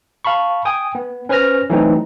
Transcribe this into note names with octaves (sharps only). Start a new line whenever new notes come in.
F5 A5 B5 C#6
G5 G#5 D#6
B3
C#4 B4 C5 G#5 F6 A#6
E3 F#3 A3 C4 D#4